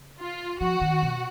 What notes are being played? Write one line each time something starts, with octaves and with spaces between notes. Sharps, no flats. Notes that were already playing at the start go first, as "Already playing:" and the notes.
Already playing: C#3
F4
F3 F#4
D#3
B2